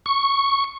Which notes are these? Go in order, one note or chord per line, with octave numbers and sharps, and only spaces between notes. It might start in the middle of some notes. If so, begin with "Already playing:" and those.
C#6